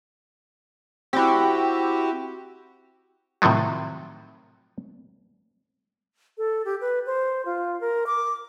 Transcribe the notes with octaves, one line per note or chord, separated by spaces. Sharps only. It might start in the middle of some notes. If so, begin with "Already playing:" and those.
C4 E4 F#4 G4
A2 C3 D#3 F3 F#3
A4
G4
B4
C5
F4
A#4
D6